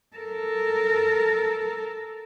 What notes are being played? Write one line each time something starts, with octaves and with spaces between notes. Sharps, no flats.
A4 A#4